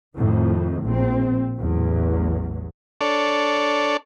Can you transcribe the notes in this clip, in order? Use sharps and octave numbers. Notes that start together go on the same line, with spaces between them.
F2 A2 D#3
A#1 C4
A1 E2 F#3
D4 A4 C#5 D5